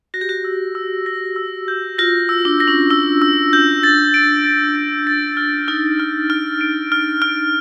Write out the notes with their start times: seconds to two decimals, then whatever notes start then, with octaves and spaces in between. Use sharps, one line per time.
0.14 F#4 A#6
0.21 G4
0.29 F#4
0.44 E6
0.75 E6
1.06 A#6
1.36 E6
1.68 G6
1.98 F4 A#6
2.29 E6
2.45 D4
2.60 A#6
2.68 C#4
2.90 D4 E6
3.22 E6
3.53 G6
3.83 A6
4.14 D7
4.45 A6
4.76 A6
5.07 A6
5.37 F6
5.68 D#4 F6
5.99 F6
6.30 F6
6.61 D7
6.92 F6
7.22 F6